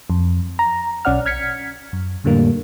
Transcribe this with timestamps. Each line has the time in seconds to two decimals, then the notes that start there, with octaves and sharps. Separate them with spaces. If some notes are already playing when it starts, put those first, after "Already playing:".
0.10 F2
0.59 A#5
1.05 B1 C#4 D5 F#5 F6
1.26 F6 G#6 B6 C#7
1.93 F#2
2.24 F2 A2 D3 G3 A#3